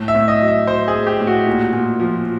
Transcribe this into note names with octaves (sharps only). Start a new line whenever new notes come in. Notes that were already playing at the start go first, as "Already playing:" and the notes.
Already playing: A2
E5
A2
D#5
F#3
E5
F#3 C5
G#4
A2
G4
A2
F#4
A#2
A#2
F3